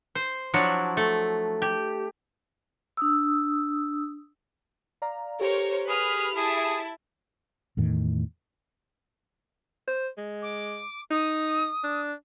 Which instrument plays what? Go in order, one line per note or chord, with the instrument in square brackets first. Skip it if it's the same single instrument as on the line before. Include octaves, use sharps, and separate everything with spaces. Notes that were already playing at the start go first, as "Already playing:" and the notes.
[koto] C5
F3 F#3 D4 E4 F#4
A3
G4
[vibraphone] D4 D#6 E6
[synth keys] D5 F5 A#5
[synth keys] G4 A4 [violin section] A#4 C5 C#5
[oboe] G#4 [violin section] B4 B5 F6
[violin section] E4 E5 A5 [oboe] G#4
[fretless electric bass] E2 A2 D#3
[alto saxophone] C5
G#3
[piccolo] D6
[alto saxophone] D#4 [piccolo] D#6
[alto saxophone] D4